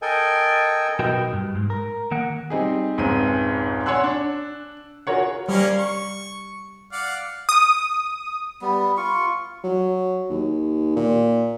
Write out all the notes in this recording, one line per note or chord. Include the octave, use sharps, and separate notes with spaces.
A4 A#4 D#5 G5 G#5
B1 F#4 A#4 B4 D#5 G5
G2
G#2
A#4
D#3 A#3 F#5
G3 C4 D#4 G#4
F1 C#2 G#2 C4 G#4 D#7
C#5 F#5 G#5 C6 E6 F#6
D4
F4 F#4 G#4 A#4 C#5 F#5
G3 A#3 C#4 A#4
C#6
D5 F5 F#5
D#6
G3 B3
F4 C#6
F#3
D#2
A#2